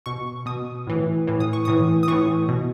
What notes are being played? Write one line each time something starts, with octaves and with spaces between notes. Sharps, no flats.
B2 C#6
B2 D#6
A2 E3
A2 E3
D#6
C#6
A2 E3 D#6
D#6
A2 E3 C#6
B2